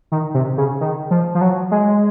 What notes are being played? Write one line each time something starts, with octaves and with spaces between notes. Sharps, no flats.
D#3
C3
C#3
D#3
F3
F3
F#3
G#3